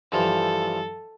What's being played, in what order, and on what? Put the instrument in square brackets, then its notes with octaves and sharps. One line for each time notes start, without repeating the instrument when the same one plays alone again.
[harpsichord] G2 E3 F3 [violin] A4